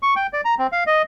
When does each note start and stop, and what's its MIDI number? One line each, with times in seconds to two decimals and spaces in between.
0.03 0.14 85
0.16 0.27 79
0.33 0.41 74
0.45 0.55 82
0.59 0.67 60
0.72 0.84 77
0.87 1.02 75